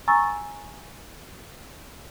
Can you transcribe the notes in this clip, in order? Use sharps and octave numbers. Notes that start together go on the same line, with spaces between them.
G#5 A#5 C#6 E6 A6